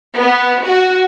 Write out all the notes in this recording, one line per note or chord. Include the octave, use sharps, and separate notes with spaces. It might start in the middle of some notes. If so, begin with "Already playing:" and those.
B3
F#4